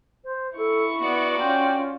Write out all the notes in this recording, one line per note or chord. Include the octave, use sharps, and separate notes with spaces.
C5
E4 A4 C#6
B3 F#4 D5
C#4 F4 G5